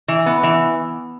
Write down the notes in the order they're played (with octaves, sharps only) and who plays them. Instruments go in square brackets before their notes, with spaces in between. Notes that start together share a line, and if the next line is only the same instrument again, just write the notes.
[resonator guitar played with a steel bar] E3
B3
E3